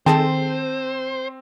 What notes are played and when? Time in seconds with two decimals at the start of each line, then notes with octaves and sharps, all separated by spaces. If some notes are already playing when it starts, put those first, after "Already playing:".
0.06 D#3 C4 G#4 A4 C5 G5 A5